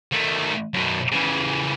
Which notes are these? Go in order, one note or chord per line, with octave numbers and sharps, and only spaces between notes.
D#3 A3
F#2 B2
C#3 E3